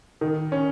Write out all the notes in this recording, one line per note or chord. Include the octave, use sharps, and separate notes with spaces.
D#3
C#4